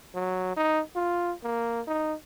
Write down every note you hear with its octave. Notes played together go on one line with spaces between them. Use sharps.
F#3
D#4
F4
A#3
D#4